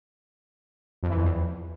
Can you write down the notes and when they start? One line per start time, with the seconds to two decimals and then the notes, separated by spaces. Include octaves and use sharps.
1.03 F2
1.10 E3
1.17 F2
1.24 E2